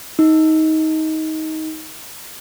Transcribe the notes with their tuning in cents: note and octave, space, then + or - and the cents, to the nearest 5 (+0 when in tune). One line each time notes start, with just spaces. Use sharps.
D#4 +20